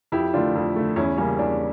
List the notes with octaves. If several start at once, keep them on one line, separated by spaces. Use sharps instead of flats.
F2 E4 G4
D3 A3 D4 F4
F2
D3 A3
E2 C#4 E4
C#3 G3 A#3 C#4
E2 D4